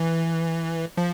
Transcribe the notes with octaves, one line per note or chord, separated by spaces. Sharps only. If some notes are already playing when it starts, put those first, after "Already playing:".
Already playing: E3
F3